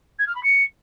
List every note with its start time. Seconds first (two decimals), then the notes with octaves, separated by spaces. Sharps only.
0.18 G#6
0.27 F6
0.35 B5
0.43 C#7